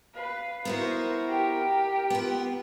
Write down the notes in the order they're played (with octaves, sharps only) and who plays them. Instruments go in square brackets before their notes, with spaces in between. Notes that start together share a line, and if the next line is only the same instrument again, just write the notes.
[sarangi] B4 [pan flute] F5
[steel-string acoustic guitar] B3 E4 F#4 [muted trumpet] A#4 [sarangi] C5
[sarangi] G4 [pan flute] G5
[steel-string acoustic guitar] B3 F4